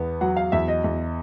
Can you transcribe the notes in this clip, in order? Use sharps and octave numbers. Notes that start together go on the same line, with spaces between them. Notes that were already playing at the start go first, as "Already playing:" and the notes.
Already playing: E2 B3
F#3 F#5
F5
E2 E5
D#5
E2